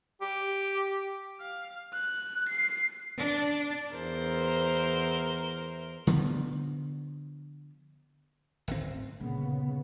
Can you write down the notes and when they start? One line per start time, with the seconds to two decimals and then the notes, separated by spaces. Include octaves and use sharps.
0.21 G4
1.40 F5
1.93 F#6
2.48 C7
3.17 D4
3.94 E2 A#4 C5
6.07 D3 F3 B3
8.68 D1 G#1 C4
9.20 G1 A#2 C#3 B3